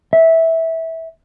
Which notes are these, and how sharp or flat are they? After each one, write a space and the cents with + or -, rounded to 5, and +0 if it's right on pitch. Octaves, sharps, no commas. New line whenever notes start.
E5 -15